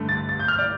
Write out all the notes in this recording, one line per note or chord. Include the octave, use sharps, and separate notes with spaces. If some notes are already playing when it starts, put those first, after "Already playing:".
Already playing: G2 D3 A3
A6
A6
G6
F6
D5